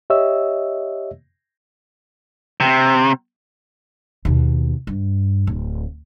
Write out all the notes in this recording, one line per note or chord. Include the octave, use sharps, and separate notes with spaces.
G4 C#5 D#5 E5 E6
C3
D#2 B2
G2
D1